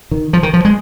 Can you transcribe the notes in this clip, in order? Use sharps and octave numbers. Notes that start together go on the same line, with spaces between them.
D#3
F3
D#3
F3
G#3